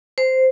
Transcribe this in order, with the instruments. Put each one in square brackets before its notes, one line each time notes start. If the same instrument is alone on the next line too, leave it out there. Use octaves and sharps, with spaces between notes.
[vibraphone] C5